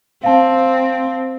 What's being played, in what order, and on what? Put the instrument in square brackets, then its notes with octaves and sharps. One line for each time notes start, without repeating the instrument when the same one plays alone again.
[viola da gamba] C4 [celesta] F5 A5